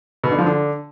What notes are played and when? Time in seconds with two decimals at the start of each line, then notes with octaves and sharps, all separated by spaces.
0.24 B2
0.31 D3
0.39 F3
0.46 D3